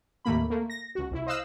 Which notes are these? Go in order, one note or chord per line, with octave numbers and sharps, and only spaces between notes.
D#2 A2 A3 A#3 B5
A3 A#3
A#6
C#2 F#4
C2 E4
C5 D#5 F5 E6 F#6